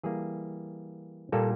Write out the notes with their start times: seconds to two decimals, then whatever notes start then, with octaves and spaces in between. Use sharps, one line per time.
0.03 E3 G3 A#3 G#4
1.32 A#2 G3 A#3 A4